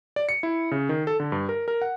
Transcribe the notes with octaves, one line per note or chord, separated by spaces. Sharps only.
D5
C#7
E4
C#3
D#3
A4
D3
G2
A#4
A#4
F#5